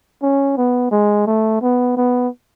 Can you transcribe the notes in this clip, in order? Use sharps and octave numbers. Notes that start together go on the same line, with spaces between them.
C#4
B3
G#3
A3
B3
B3